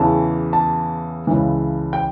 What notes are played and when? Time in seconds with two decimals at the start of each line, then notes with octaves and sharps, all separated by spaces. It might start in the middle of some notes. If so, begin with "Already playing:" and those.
Already playing: E2 C#3 E3 A5
0.53 A5
1.27 C#2 C#3 E3
1.93 G5